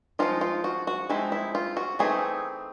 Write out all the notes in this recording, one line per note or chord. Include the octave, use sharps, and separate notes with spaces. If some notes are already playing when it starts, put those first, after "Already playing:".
F3 G#3 C4 D#4 F4
F4
F#4
F#4
F3 G#3 C4 D#4 E4
E4
F4
F#4
E3 A3 C4 D#4 G#4